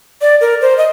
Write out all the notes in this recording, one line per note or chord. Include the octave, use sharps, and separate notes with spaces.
D5
A#4
C5
D#5